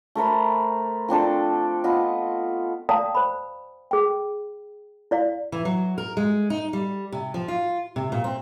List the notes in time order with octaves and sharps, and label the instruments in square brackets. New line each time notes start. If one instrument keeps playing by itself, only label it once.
[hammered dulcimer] A3 A#4 C5 B5
F3 C4 D4 A4
B3 F4 D#5
[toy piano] D5 F5 G5 A5 A#5 D#6
C5 B5
G#4 G5
E4 D5 F5
[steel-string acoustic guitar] E3
F#3
A#4
G#3
D#4
G3
C3
F3
F4
C3
A#2
C4